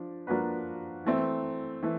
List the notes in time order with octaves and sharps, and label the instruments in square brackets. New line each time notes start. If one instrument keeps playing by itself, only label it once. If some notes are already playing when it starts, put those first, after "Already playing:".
Already playing: [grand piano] F3 D4
F3 A#3 D4 F#4 B4
E3 A3 C4
E3 A3